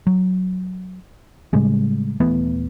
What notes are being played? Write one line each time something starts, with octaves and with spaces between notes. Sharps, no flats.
F#3
A2 C#3 G3 G#3
D#1 E3 A3 B3